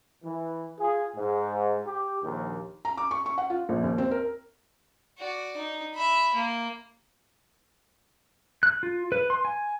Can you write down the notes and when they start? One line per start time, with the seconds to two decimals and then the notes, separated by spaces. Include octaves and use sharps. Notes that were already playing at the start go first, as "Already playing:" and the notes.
0.24 E3
0.79 F4 G#4
1.16 G#2
1.87 G4
2.23 A#1 D#2
2.85 A#5
2.97 D6
3.11 C#6
3.26 C#6
3.38 F#5
3.50 F4
3.69 A#1
3.84 D#2
3.98 C4
4.11 A#4
5.19 F#4 D5
5.57 D#4
5.95 E5 B5
6.35 A#3
8.63 F#6
8.83 F4
9.12 B4
9.30 C6
9.45 G#5